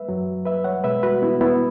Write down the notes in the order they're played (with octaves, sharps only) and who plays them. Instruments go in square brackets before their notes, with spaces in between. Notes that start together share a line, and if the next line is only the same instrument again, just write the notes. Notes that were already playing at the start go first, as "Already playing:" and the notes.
Already playing: [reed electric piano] B4 E5
F#2 F#3
B4 E5
C#5 F#5
B2 G#3 B4 E5
F#4 B4
B3 E4
B3 E4